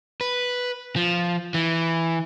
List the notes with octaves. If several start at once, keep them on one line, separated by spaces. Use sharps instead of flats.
B4
F3
E3